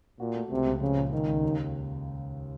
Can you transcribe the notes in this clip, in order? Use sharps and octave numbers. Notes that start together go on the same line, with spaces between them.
A#2 F#4
A3
C#2 C3
C#2
C#3 F3
A#2
C#2 D#3
C#2
D#2